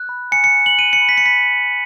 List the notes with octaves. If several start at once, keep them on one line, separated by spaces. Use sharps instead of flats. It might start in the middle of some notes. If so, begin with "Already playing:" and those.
Already playing: F#6
B5
G#5 C#7
C#7
G#5
F#7
F#6 D#7
C#7
B5
B6
C#7
B5 B6